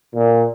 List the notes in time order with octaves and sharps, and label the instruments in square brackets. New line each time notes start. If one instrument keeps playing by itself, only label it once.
[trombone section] A#2